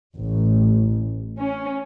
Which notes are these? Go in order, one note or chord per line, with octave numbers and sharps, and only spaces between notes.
A1
C#4